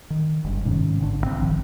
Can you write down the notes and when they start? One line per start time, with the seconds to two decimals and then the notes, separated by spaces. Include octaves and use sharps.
0.10 D#3
0.44 F#1 G2
0.65 G#2 C3 D#3 C#4
1.00 A1 D3 D4
1.21 A#1 D#3 C4
1.41 G1 G#2 D#3 F3